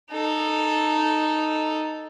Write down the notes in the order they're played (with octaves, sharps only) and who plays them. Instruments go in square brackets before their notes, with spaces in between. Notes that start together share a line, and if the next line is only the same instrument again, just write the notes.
[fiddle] D#4 A4